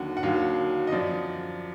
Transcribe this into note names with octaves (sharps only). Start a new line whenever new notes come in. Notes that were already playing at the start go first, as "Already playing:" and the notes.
Already playing: D#2 D3 F#3 F#5
F#5
D#2 D3 F#3 F5
D#5
F#2 F3 D5